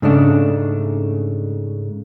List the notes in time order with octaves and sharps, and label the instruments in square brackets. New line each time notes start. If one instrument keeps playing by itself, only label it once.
[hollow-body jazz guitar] G#2 C#3 A3 D4